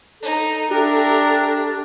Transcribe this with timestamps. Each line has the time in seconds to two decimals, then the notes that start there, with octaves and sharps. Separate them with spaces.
0.21 D#4 A4
0.71 D4 G4 A#4 E5